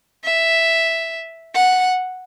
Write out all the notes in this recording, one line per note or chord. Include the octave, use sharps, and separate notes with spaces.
E5
F#5